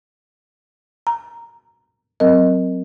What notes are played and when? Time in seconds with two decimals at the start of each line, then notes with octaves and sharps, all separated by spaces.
1.07 A#5
2.20 F#3 C4 A#4 D#5